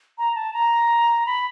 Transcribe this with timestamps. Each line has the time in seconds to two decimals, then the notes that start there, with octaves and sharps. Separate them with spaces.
0.18 A#5
0.35 A5
0.53 A#5
1.26 B5